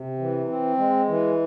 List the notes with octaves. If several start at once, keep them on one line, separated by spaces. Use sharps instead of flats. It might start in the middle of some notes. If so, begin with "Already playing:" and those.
Already playing: C3
E3
C4
G#3
E3